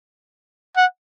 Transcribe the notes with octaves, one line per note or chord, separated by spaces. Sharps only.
F#5